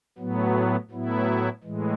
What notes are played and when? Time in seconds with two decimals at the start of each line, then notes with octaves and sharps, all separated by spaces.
0.18 A2 F#3 B3
0.90 A2 F#3 B3 E4
1.64 A2 E3 G#3